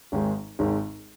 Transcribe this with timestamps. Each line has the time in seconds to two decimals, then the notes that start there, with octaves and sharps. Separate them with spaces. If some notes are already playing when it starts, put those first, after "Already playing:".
0.12 G#1 G#2 D#3 G#3
0.59 G#1 G#2 D#3 G#3